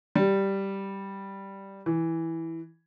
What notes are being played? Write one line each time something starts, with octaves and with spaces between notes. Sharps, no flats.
G3
E3